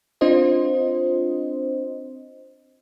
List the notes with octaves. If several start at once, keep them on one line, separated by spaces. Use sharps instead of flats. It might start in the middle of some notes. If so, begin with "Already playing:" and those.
C4 D4 F4 C5 D#5